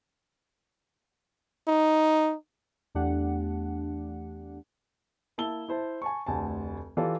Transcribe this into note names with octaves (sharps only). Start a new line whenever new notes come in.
D#4
E2 A3 D4 G4 F#5
A#3 E4 A5 E6 G7
E4 C5 A5
G#5 A5 C#6
F1 D2 G#5 A5
E3 F4 G4 A4 D5